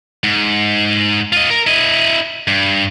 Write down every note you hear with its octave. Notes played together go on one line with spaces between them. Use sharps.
G#2
F4 D#5
A#4
E4 D#5
G2